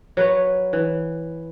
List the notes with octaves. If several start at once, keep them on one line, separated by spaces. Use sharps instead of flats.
F#3 B4 C#5
E3